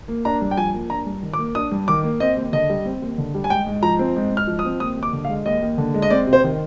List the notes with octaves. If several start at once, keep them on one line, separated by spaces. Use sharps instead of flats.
A#3
D4 A#5
G2
G5
F3 G#5
A#3
D4 A#5
G2
D#3
D6
A#3
D4 D#6
G2
D#3 D6
A#3
C4 D#5
D#2
D3 D#5
G3
C4
D#2
D3
G3
G#5
G#2 G5
G#2
F3 A#5
C4
G#2
G#2
F6
F3
D#6
C4
D#2 D#6
D#2
D6
D3
F5
G#3
D#2 D#5
D#2
D3
G#3
D#5
C4 D5
C3
C5
D#3